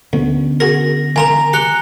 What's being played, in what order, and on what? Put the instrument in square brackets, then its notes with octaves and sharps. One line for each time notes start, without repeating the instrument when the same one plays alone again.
[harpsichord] D2 [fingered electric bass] D3 B3 C#4
[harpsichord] F#4 G#4 A#4 [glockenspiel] A#6
[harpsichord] D#3 F4 A#4 [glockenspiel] G#5 A#5 F7
[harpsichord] G4 A#5 D6 [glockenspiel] F#6 C#7 G7